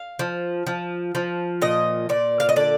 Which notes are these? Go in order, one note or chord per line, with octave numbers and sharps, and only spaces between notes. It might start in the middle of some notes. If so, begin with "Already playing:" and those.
Already playing: F5
F3
F3
F3
A#2 D#5
A#2 D5
F5
D#5
D3 D5